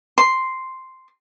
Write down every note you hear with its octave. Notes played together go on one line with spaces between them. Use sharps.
C6